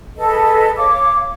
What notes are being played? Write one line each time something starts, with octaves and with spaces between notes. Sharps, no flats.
G#4 A4 B4 D#5
C#5 F5 D6